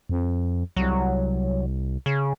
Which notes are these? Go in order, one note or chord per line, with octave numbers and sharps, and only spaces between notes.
F2
C2 F#3
C#3